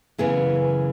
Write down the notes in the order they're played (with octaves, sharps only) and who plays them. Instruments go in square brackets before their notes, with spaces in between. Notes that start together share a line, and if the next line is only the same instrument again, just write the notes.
[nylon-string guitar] F#2 C#3 E3 B3 G#4